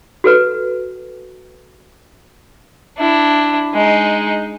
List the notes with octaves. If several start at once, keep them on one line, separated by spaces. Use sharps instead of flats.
F#4 A4 B4
D4 E4
G#3 D#4